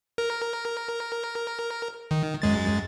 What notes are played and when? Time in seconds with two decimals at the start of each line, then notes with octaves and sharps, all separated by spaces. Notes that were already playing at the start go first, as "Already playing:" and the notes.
0.18 A#4
2.11 D#3
2.42 F#2 G#3 A6